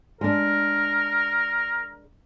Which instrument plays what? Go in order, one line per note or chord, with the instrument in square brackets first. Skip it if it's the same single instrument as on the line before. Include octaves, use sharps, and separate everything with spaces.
[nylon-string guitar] G#3 D4 [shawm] A#4